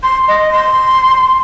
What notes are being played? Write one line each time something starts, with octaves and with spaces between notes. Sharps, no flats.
C6
D#5
C6